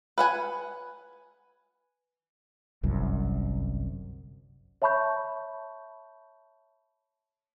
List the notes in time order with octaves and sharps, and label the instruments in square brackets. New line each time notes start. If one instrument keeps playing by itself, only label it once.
[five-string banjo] B4 F#5 G#5
[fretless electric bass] G1 C2 F#2
[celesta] C#5 E5 A5 B5 C#6 G6